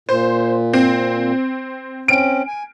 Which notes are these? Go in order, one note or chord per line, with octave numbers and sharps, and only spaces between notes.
A#2 C5
C4
C4 C#4 D7
G#5